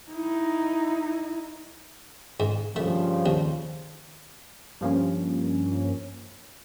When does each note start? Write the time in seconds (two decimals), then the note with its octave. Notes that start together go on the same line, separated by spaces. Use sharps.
0.11 D#4 E4
2.40 G#2
2.76 G2 C#3 F3 A3
3.26 D#2
4.81 G2 F3 A#3 C#4